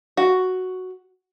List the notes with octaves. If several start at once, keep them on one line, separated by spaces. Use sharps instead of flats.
F#4